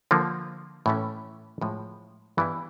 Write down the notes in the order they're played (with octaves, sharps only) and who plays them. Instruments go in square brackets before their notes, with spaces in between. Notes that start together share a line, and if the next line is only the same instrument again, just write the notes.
[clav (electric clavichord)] D3 F3 A#3
A2 E3 A3 C#4
A2 F3 G#3
G2 E3 G3 B3 E4